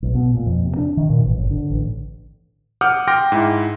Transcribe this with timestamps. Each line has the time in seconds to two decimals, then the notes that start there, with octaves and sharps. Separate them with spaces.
0.03 B1
0.15 B2
0.35 A#2
0.46 F2
0.65 C3
0.77 D4
0.97 D#3
1.10 A#2
1.24 A1
1.37 G1
1.51 D3
1.70 A1
2.81 F#5 D6 D#6 F6 G6
3.07 G5 C6 D6 F6 A#6
3.32 G#2 E4